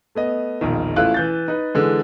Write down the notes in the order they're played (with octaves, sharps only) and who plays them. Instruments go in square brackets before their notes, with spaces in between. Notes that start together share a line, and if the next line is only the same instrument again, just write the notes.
[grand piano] A3 B3 D#5
E1 A#1 A#2 D#3
A1 A3 E4 F4 F#6
E3 G6 A6
D#4 B4
D3 E3 G#3